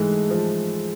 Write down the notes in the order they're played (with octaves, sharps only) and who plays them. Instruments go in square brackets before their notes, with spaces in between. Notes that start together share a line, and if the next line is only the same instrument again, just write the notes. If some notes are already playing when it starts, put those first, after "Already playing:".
Already playing: [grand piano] G#2 E3 A3 [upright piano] G#3
[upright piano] F3